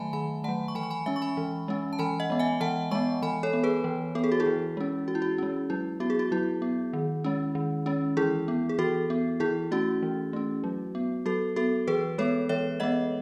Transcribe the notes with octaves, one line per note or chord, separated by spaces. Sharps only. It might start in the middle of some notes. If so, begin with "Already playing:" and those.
Already playing: D#3 F#3 A3 E5 G#5 A5 B5
D#3 G#5 B5
F#3 A3 F#5 A5
C#6
E3 G#5 B5
C#6
G#5 B5
G#3 C#4 E5 G#5
C#6
G#5 B5
E3
G#3 C#4
A5
E3 G#5 B5
D#5 F#5
G#3 B3
E5 G#5
E3 F#5 A5
G#3 B3 A5 C#6
E3 G#5 B5
A4 C#5
B3
G#4 B4
E3
B3 A4
G#4
F#4
E4 G#4
E3
G#3 C#4
E3 F#4
E4
F#4
G#3 C#4
F#3 E4
B3 F#4
G#4
F#4
F#3 E4
B3
D#3
G#3 C#4
D#3
G#3 C#4
E3 E4 G#4
B3
G#4
E3 F#4 A4
B3
E3 E4 G#4
A3 C#4 F#4
E3
A3 C#4
F#3
B3
F#3 F#4 A4
B3 F#4 A4
E3 G#4 B4
G#3 B3 A4 C#5
E3 C#5 E5
G#3 B3 D#5 F#5